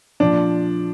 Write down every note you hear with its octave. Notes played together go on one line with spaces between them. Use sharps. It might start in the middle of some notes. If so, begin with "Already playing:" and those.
A#2 F3 D4